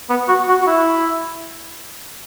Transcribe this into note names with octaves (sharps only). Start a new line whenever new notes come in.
B3
F#4
F#4
F#4
E4